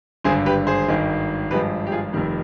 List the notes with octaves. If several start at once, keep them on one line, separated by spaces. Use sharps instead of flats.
G#1 G2 D3 G#4 C5
G4 B4
G#4 C5
G#1 G2 D#3 G#3
G#1 G2 F3 G#3 G4 B4
G4
F4 G#4
F1 F2 D#3 G3